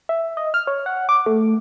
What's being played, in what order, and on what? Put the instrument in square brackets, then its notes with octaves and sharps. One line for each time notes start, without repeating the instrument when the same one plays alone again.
[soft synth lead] E5
D#5
F6
C#5
F#5
D6
A3